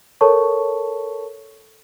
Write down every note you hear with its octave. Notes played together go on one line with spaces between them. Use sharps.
A4 A#4 C#5 A5 C#6